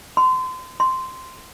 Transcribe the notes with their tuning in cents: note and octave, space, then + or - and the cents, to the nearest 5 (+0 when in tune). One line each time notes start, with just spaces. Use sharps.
C6 -30
C6 -10